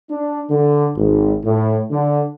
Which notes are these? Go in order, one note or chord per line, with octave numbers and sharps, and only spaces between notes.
D4
D3
G#1
A2
D3